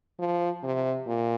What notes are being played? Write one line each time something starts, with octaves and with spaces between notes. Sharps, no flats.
F3
C3
A#2